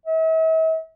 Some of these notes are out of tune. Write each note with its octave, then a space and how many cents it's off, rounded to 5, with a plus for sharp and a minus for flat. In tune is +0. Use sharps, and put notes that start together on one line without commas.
E5 -45